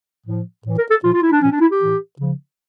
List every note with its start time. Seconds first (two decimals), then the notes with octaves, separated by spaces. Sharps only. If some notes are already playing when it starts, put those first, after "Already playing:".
0.26 A2 F3
0.64 A2 E3
0.77 A#4
0.90 A4
1.02 A#2 F3 F4
1.12 F4
1.22 E4
1.31 D4
1.41 F3 C#4
1.44 A#2
1.50 D4
1.60 E4
1.70 G4
1.80 A2 E3
2.18 C#3 F3